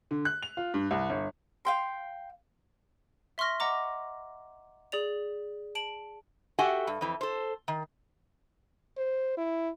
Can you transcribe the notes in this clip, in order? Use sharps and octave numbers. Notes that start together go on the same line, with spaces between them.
D3
F#6
F7
F4
G2
C2
G1
F5 G5 C6
E5 C6 C#6 F6 A#6
D#5 F#5 A#5 D6
G#4 D5 F7
A5 D7 F#7
F#4 G4 A4 E5 F#5 G#5
G2
F2 E3
A4 C5
D#3
C5
E4